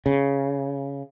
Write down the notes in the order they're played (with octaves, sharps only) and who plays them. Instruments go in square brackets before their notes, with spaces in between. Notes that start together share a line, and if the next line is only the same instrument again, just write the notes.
[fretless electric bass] C#3